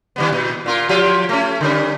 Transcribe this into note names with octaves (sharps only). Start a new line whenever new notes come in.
D#3 G3 B3
A#2
A#2 F4 A#4
F3 F4 G4
A3 C#4
D3 G3 C#4